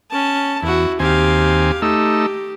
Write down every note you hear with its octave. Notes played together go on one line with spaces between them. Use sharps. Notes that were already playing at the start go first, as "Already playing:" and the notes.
C#4 A5
E2 E4 F#4
D#2 C4 G4 F5 G#5
A3 D#4 G4 E6